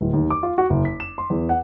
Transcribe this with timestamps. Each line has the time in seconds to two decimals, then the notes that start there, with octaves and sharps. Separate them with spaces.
0.01 D1
0.13 D#2
0.30 D6
0.43 F4
0.58 F#4
0.70 F#1
0.85 B6
1.00 E7
1.18 C6
1.30 E2
1.49 F#5